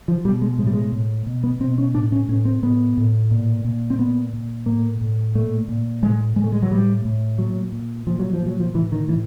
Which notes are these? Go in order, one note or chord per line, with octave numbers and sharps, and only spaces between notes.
F3
B2 G3
G#3
A2 G#3
G3
G#3
A2
B2
B3
B2 C4
C#4
A2 D4
C#4
A2 C#4
C4
A2 B3
A2
A#2
A#2
C4
A#2 B3
A#2
A2 A#3
A2
A#2 A3
A#2
A2 G#3
A2 G#3
A3
G#3
F#3
A2 G3
A2
A#2 F#3
A#2
A#2 F3
F#3
F3
A#2
F#3
F3
A2 E3
D#3
A2 E3